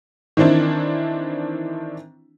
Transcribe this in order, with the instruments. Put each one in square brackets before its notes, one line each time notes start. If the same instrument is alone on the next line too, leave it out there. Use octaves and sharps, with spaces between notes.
[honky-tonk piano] D#3 E3 C4 D4 E4